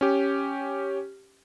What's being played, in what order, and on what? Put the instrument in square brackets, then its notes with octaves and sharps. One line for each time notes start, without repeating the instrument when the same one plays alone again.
[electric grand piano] C#4 G4